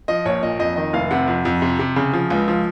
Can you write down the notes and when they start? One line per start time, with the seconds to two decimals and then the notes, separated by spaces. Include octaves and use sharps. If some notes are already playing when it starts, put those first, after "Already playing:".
0.08 F3 D#5
0.25 A#1 C#5
0.43 A#2 D#5
0.59 F2 D#5
0.76 D#3 D#5
0.93 F1 F5
1.11 C3 F#5
1.28 F2
1.45 F2
1.62 C3
1.79 C3
1.96 C#3
2.13 F3
2.30 C#2
2.48 F3